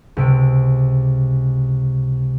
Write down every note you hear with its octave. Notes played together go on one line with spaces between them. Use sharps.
C#2 C3 D7